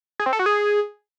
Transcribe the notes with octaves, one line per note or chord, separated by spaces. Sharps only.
G#4
C4
A4
F#4
G#4